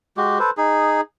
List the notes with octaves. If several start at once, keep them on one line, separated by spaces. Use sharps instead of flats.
G#3 F#4 G4
A4 B4 C5
D#4 G#4